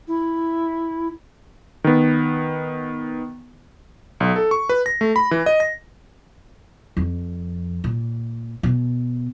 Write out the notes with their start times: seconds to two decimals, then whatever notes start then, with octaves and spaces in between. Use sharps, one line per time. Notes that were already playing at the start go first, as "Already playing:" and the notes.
0.08 E4
1.84 D#3 B3
4.20 B1
4.36 A4
4.51 C#6
4.69 B4
4.86 A#6
5.01 A3
5.16 B5
5.31 E3
5.46 D#5
5.60 A#6
6.97 F2
7.84 A#2
8.63 B2